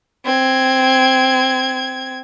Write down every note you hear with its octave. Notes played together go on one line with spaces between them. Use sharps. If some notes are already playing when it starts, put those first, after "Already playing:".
C4 G#6